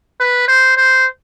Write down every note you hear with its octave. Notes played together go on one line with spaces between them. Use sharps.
B4
C5
C5